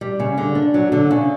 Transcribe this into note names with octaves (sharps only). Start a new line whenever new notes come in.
G3
C#3
D3
D4
F#3
D3
C#3